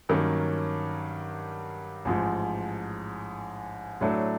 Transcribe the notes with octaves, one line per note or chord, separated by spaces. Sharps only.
G2 D#3 F#3 A#3 C#4
A1 G#2 F3
A2 F#3 A3 D4